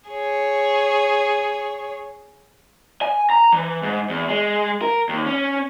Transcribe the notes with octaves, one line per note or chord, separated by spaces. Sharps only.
G#4 C#5
G#5
A#5
E3
G#2
E2
G#3
A#4
D#2
C#4